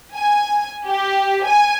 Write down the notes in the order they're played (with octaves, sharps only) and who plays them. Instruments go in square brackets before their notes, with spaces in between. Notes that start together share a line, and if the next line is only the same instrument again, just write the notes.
[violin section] G#5
G4
G#5